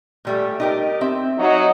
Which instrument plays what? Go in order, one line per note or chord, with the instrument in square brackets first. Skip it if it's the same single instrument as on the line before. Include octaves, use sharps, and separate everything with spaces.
[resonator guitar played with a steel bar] A#2 G3 A3
D#4 G4 A#4
C4 E5
[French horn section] F#3 D#4